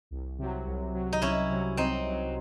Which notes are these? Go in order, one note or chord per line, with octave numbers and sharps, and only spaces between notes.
C2
C3 F#3
C2
C3 F#3
D#4
C2 C#4 E4
C3 F#3
C2 C4 D#4
C3 F#3